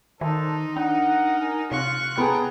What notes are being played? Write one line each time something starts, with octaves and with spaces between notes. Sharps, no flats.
D#3 D4 D#4 A4 C5
D4 A#4 F#5
G#4 A#4
C3 F4 C#6 F#6
B3 C#4 D4 G#4 G5 A#5